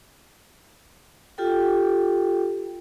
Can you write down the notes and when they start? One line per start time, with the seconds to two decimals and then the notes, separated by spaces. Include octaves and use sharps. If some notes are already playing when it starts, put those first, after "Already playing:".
1.38 F4 G4 A4 G5